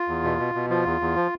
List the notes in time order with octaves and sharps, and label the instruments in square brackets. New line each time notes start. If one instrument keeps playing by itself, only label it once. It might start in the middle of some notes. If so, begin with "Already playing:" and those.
Already playing: [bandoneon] F4
E2
B2
B2
B2
F3 F4
E2
E2
F3